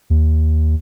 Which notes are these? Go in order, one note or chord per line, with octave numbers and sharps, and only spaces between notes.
D#2